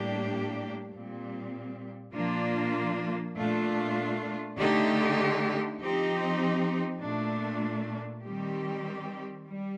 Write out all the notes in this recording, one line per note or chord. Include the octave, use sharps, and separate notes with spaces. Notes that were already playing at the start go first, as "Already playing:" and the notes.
Already playing: A2 G3 A#3 D4 G4
A#2 G3 C4
A#2 F3 A#3 D4 F4
A#2 A3 D4 F4
D3 A3 D#4 G4
F3 C4 D#4 G4
A#2 A3 D4
D#3 G3 C4 G4
G3